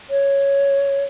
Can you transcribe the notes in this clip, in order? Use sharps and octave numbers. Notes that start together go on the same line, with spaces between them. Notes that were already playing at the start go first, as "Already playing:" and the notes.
C#5